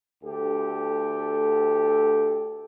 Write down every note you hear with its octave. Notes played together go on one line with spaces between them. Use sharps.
D2 G4 A4